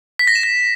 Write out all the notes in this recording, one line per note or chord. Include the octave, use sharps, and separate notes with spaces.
B6
A#6
E7
A#6